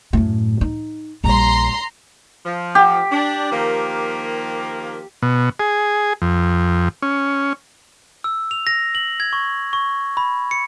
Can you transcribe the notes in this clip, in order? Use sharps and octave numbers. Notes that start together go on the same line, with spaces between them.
F#2 A2
D#4
A#1 G3 A#5 C6
F3
G4
D4
D#3 F3 A#3
B2
G#4
F2
C#4
E6
F7
A#6
F#7
G#6
C#6
C#6
B5
C#7